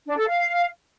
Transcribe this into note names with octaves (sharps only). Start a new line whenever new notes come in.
D4
A4
F5